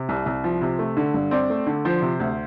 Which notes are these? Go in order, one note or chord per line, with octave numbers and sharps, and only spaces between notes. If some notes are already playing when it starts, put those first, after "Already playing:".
Already playing: C3
C2
C2
F3
C3
A3
D3
G2
C4 D5
A3
D3
F3 C5
C3
D2